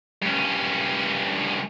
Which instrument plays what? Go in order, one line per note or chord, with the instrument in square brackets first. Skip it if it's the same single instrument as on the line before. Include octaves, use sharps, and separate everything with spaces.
[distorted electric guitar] G2 C#4